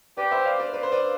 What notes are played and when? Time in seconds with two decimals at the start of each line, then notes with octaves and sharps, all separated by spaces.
0.17 G4 B4 D5
0.31 C5 E5
0.45 D5 F5
0.60 B4 D5
0.73 B4 D5
0.83 C5
0.92 B4 D5